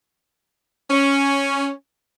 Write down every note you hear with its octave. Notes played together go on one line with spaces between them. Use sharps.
C#4